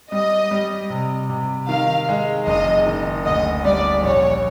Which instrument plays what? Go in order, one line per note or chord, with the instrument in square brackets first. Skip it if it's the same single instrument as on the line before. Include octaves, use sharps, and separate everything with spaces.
[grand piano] G3 [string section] D#5
[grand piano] G3
C3
C3
[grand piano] D#3 [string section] F5
[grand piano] G#3
[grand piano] F#1 [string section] D#5
[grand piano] D#3
[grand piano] D2 [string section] D#5
[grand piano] G3 [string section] D5
[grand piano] A#1 [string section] C#5